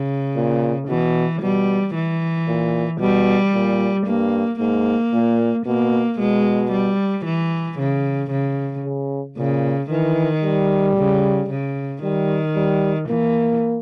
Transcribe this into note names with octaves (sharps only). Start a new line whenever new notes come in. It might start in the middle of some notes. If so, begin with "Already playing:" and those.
Already playing: C#3
A#2
B2 E3
B2 G3
E3
A#2
B2 G3
A#2
G2 A#3
G#2 A#3
A#2
B2 A#3
B2 G#3
G3
E3
C#3
C#3
C#3
A#2 C#3
D#3 E3
G3
C#3
C#3
D#3 G3
G3
E3 A#3